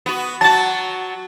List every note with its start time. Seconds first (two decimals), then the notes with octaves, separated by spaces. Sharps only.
0.06 B3 F#4
0.41 F#3 F#4 A5 A6